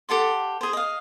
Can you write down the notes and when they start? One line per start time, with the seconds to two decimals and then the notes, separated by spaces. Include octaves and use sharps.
0.09 G4 A4 F#5 C6
0.61 G#4 C5
0.73 D#5 F5